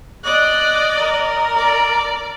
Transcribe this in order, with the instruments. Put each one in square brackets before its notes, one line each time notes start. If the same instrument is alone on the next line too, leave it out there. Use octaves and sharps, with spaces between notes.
[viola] D5 D#5 [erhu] F#6
[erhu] A#4
[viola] D5